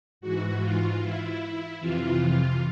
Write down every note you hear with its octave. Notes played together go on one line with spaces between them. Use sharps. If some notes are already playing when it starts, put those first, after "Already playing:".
G#2 E3 F#4
F4
E4
F2 C3 E3 F4